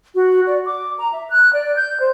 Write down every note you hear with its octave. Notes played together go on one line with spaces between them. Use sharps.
F#4
D5
D6
A#5
E5
F#6
D5
G6
C5